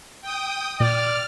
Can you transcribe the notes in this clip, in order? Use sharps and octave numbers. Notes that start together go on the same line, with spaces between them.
G5 D#6
A#2 D5 F6